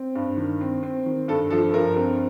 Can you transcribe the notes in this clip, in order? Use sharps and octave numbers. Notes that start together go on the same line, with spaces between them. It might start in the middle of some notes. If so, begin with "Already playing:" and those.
Already playing: C4
G2
D#3
C4
C4
D#3
G2 A4
F3 A4
G2 A#4
C4 A#4